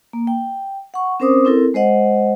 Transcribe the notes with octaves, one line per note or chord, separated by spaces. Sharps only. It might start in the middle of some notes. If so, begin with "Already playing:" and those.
A#3
G5
F#5 C#6
C4 C#4 A#4 C5 D6 D#6
C4 E4 A4 A#4
G#3 C5 D#5 F#5